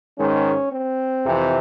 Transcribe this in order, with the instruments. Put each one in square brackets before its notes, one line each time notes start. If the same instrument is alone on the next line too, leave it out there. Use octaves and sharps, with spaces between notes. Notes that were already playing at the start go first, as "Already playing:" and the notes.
[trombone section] G#2 D#3 G#3 C#4
C4
F2 C3 E3